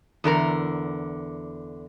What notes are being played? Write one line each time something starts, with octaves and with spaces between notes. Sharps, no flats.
E2 D3 A#4 A#5